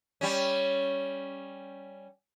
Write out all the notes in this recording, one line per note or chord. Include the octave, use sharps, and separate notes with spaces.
G3 C#4